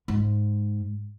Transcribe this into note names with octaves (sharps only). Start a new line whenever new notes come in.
G#2